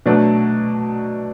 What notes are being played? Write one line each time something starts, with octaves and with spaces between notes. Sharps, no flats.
B2 F#3 A3 D4